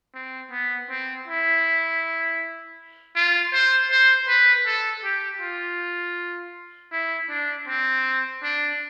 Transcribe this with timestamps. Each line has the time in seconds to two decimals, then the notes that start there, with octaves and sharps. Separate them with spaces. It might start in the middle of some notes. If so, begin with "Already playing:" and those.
0.14 C4
0.51 B3
0.90 C4
1.28 E4
3.15 F4
3.53 C5
3.90 C5
4.28 B4
4.66 A4
5.04 G4
5.41 F4
6.92 E4
7.29 D4
7.67 C4
8.43 D4